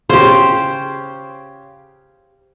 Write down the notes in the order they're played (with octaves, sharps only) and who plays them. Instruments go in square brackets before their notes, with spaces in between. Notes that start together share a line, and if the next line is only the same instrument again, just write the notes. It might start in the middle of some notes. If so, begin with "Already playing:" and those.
[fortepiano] C#3 [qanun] G4 C5